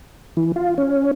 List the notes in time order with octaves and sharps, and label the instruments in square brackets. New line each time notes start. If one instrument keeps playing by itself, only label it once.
[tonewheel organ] E3
F4
C#4